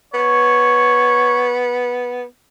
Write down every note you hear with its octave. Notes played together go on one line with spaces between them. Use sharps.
B3 C#5